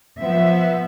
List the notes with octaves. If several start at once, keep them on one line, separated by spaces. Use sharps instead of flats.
F3 B3 E5